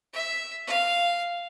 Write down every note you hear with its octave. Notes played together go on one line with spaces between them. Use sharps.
E5
F5